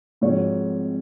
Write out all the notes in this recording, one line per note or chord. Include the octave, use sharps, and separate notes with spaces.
G#2 F3 C4 F#4 C#5